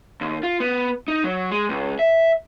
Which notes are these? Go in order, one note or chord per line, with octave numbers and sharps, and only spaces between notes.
D#2
F4
B3
D#4
F#3
G#3
C#2
E5